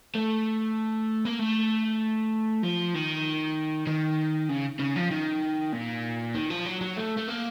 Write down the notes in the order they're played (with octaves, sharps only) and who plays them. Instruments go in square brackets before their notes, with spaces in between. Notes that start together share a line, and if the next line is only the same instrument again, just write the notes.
[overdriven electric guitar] A3
A#3
A3
F3
D#3
D#3
C#3
C#3
F3
D#3
A#2
D#3
F3
F#3
F#3
A3
A3
A#3